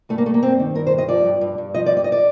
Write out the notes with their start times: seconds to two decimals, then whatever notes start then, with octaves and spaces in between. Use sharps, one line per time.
0.09 G2 A3
0.18 A#3
0.26 G2 A3
0.34 A#3
0.42 G2 C4
0.60 D#3
0.75 G2 A#4
0.87 C5
0.92 G2
0.98 D#5
1.08 F3 D5
1.25 G2
1.41 G2
1.58 G2
1.74 F3 D#5
1.86 D5
1.91 G2
1.97 D5
2.04 D#5
2.12 D5